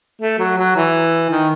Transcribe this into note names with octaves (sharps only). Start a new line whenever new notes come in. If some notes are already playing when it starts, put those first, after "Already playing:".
A3
F#3
F#3
E3
D#3